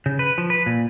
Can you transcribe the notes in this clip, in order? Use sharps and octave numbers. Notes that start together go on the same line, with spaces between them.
C#3
B4
F3
B4
A#2